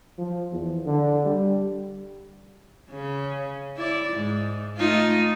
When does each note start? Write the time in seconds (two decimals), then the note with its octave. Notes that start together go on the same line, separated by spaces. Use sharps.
0.18 F3
0.52 E2
0.86 D3
1.25 G3
2.91 C#3
3.77 E4 D5
4.13 G#2
4.78 A3 D#4 F4